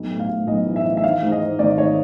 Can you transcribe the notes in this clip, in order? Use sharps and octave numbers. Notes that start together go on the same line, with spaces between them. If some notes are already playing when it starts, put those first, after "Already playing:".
Already playing: B1
A2
F5
A2
B1 D#5
E3
E5
E3
E5
D#3 F5
G#2
D#5
G#2
G#1 D5
D#3 C#5